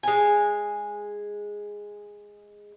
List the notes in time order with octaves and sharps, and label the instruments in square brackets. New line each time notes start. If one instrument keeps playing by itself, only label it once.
[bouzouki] G#3 G#5